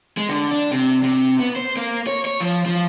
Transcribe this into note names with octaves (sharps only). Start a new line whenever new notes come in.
G#3
D3
D4
C3
C3
B3
C5
A#3
C#5
C#5
F3
F3